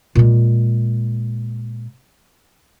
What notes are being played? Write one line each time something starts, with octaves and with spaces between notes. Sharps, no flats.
A#2 G#3